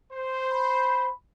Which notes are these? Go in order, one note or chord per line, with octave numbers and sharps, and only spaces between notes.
C5
B5